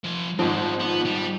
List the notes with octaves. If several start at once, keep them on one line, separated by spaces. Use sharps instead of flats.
F3 G#5
G#1 G#2 F3 C4 D#4
B3
G3